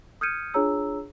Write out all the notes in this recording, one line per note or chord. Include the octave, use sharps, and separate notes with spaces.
D#6 F6 G6 G#6 C#7 D#7
D4 F4 G#4 C#5 A#5 E6